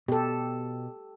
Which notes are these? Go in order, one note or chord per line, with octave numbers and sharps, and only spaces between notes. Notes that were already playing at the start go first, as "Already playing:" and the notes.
B2 G4 A4